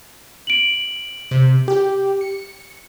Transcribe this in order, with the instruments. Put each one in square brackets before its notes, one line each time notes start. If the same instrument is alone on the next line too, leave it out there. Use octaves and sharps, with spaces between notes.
[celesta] D7 F#7
[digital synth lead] C3
G4
C#7